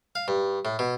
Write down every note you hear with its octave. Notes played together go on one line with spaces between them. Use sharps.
F5
G2
A2
B2